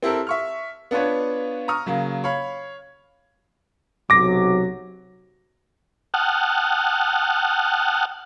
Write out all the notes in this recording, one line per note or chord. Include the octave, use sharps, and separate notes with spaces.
C4 E4 G4 A4 A#4
E5 C#6 F6
B3 D4 F4 B4 C#5
A#5 C#6 D#6 F6
C#3 F#3 A#3
C#5 F5 B5
B1 C3 F#3 D6 A#6
F#5 G5 A5 D#6 F6 F#6